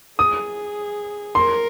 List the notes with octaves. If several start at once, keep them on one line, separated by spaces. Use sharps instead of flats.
G#4 D#6
A#4 C6